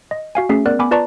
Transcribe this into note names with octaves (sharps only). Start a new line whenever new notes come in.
D#5
F#4 F5 G#5
A3 C#4 G#4 E5 C7
B3 A#4 D5 F#6
B3 G#5 B5 D6
F4 B4 D5 A5 A#5 C#6